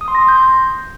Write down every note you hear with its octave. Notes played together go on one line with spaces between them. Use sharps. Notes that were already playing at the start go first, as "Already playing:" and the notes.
D#6
C6
A#6
C6
G6